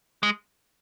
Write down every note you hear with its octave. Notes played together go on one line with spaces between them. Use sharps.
G#3